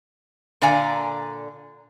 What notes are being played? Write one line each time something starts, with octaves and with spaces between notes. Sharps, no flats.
A#2 D3 D5 F5 G#5 A#5